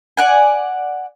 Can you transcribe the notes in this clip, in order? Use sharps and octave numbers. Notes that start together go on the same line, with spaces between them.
D5 F#5 G#5